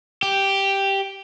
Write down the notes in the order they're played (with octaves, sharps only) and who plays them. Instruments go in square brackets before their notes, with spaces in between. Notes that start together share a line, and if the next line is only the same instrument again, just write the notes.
[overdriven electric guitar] G4